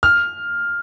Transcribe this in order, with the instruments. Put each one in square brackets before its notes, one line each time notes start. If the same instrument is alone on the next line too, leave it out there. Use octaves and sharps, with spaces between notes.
[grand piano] F6